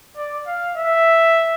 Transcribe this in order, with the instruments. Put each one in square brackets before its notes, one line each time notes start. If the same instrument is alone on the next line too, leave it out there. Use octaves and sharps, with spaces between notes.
[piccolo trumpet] D5
F5
E5